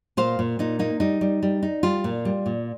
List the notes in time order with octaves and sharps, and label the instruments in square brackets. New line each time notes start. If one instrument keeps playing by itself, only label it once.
[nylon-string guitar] A#2 C5 F5
A#2
A#2 D#4
A#3 D#4
G3 D#4
G3
G3
D#4
G3 F4
A#2
G3
A#2